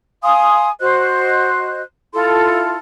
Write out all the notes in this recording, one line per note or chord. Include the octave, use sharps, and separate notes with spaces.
F5 G#5 C6 D#6
F#4 C5 D#5 F#6
E4 F4 A4 C6